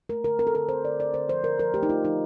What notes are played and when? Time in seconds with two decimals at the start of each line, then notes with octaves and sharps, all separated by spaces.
0.09 A3 A#4
0.24 D3 A#4
0.39 C4 A#4
0.47 A4
0.54 D3 A#4
0.69 C4 C5
0.84 D3 D5
0.99 D3 D5
1.14 D3 C5
1.29 F3 C5
1.44 D3 A#4
1.59 F3 A#4
1.74 A3 G4
1.83 D#4
1.90 A3 F4
2.05 F3 D#4